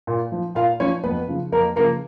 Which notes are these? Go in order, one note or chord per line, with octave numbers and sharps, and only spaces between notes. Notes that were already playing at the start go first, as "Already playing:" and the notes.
A#2
F3
A#2 F4 F5
F3 C#4 C#5
F2 B3 B4
C#3 F3
F2 A#3 A#4
C#3 F3 A#3 A#4